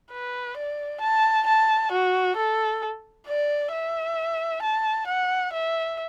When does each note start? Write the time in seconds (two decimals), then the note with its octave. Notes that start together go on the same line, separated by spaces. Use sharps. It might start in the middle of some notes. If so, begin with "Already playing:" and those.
0.11 B4
0.57 D5
1.01 A5
1.47 A5
1.92 F#4
2.37 A4
3.27 D5
3.72 E5
4.63 A5
5.07 F#5
5.53 E5